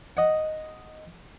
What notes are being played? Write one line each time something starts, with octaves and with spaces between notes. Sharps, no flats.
D#5 F#5